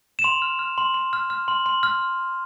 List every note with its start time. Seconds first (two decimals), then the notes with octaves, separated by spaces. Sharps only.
0.19 E7
0.24 C6 F7
0.42 F6
0.59 F6
0.78 C6
0.94 C6
1.13 F6
1.30 F6
1.48 C6
1.66 C6
1.83 F6